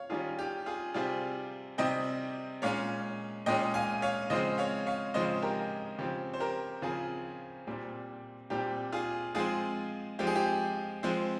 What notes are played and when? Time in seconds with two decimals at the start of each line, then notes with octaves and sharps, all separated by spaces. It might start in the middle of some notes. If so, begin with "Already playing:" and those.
Already playing: C#5 F5
0.10 D#3 G3 C#4 F4 G#4
0.39 G4
0.66 F4 G#4
0.94 C3 G3 C4 F4 G#4
1.78 C3 G3 C4 D#5 G5
2.62 A#2 G#3 C#4 C#5 F5
3.46 A#2 G#3 C#4 D#5 G5
3.74 F5 G#5
4.02 C#5 F5
4.30 C#3 F3 G#3 C4 C5 D#5
4.58 C#5 F5
4.86 C#5 F5
5.14 C#3 F3 G#3 C4 C5 D#5
5.42 G4 A#4
5.99 C#3 F3 C4 G4
6.33 C5
6.40 G4 A#4
6.82 C#3 F3 C4 F4 G#4
7.67 A#2 G3 C4
8.50 A#2 G3 C4 G4
8.92 F4 G#4
9.35 F3 G#3 C4 F4 G#4
10.19 F3 G#3 C4 G4
10.27 G#4
10.36 G4
11.03 F3 G#3 C4